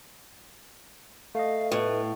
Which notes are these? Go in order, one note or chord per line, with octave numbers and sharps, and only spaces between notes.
A3 D#5 F5
A2 B4